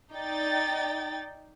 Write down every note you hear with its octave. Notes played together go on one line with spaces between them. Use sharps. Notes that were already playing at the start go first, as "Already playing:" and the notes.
D#4 D5 G5 A6